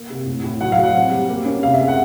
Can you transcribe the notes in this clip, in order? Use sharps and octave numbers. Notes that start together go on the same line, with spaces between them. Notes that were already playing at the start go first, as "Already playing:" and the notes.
Already playing: A#3
C3
A2
A2
F#3 F#5
F5
F#3
F#5
C4
G3
A#3
C#4
C3 F5
E5
G#3
F#5